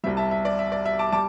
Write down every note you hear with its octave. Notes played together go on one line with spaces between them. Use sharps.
C2 C3 G3 E5
E5 A5
E5
D5
E5
D5
E5
A5 D6
G3 A5 D6